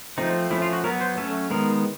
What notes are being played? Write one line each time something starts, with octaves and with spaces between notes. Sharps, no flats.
F3 A3 C4 D#4
F3 A3 C#4 E4
F4
F#4
F#3 B3 A#4
C5
F#3 A3 C#4 A4
D#3 G#3 B3 A#4